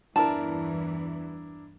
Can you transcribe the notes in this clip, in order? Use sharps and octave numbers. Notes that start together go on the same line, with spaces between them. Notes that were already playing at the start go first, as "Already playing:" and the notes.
E2 G2 E3 D4 E4 A#4 A5